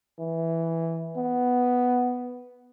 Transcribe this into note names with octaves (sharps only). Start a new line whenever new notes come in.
E3
B3